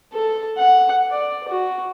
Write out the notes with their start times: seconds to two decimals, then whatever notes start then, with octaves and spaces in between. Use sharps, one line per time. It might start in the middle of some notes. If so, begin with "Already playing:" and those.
0.13 A4
0.58 F#5
1.11 D5
1.49 F#4